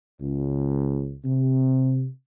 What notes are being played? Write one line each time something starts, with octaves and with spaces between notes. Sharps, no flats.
C#2
C3